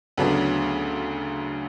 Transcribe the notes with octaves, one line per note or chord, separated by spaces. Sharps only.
D2 C#3 F#3 B3 D4